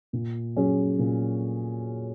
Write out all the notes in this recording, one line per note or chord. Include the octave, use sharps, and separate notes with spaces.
A#2
F#3 C#4 G#4
A#2